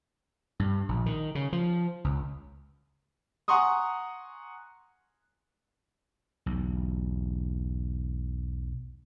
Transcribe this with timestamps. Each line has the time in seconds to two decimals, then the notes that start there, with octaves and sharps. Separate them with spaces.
0.59 G2
0.89 A#1
1.06 D#3
1.35 C#3
1.53 F3
2.04 C#2
3.48 F#5 G#5 A#5 C6 C#6 D#6
6.46 B1 E2